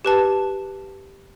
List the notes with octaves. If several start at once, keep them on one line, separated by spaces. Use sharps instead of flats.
G4 B4 A5